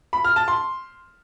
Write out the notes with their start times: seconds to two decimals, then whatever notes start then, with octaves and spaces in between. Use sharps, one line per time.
0.13 B5
0.25 F6
0.36 A5
0.48 C6